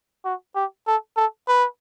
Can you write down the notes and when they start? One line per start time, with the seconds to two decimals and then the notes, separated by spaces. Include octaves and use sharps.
0.25 F#4
0.55 G4
0.87 A4
1.17 A4
1.48 B4